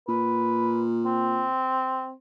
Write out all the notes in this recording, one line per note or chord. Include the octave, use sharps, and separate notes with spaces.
A#2 B4
C4